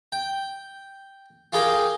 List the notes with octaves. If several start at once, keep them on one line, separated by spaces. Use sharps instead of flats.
G5
F4 G4 G#4 A#4 F5 G5